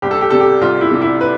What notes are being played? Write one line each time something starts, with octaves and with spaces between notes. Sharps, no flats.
C2 G4
A4
G4
C3 G3 A4
G4
C2 F4
E4
C3 G3
E4
B4